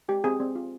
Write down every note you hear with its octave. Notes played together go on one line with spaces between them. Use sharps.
G#3 G4
C4 G4 G#4
C4
F4